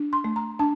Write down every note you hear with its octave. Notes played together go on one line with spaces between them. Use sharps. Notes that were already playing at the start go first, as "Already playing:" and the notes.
Already playing: D4
C6
A3
A#5
D4 A5